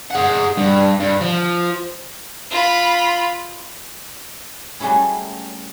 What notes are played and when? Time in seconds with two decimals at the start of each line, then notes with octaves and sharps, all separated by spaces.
0.10 G#4 F#5
0.57 G2
1.00 G2
1.21 F3
2.51 F4 B5
4.80 F#3 G3 A3 C#4 E4 G#4